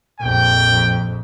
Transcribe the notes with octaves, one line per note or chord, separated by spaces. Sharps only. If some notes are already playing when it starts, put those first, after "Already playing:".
A#1 F2 G5